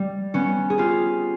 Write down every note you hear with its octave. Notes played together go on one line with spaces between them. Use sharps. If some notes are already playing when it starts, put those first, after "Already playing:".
Already playing: G3
B3 C#4
G#4
F4 G4